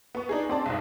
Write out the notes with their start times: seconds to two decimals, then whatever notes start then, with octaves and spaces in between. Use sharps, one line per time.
0.15 B3 C#6
0.29 D4 D#4 G#4
0.49 C4 D5 A5
0.66 B1 G#2